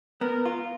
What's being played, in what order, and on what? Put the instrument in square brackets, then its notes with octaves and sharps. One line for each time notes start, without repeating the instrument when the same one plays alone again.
[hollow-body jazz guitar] B3 [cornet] A#4
[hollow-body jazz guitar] F4